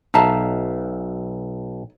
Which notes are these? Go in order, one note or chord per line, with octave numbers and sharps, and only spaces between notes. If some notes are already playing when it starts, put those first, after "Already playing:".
B1 D#4 E5 F5 A5